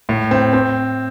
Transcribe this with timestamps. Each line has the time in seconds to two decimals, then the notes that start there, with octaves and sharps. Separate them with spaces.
0.09 A2
0.31 C4
0.53 C4